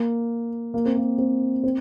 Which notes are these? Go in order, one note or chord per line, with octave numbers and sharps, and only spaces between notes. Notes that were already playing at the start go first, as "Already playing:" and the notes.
Already playing: A#3
A#3
C4
A#3
C4
C4